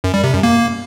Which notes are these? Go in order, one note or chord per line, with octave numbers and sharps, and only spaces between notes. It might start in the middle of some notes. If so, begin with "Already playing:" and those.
F#2
G3
C3
F#2
A#3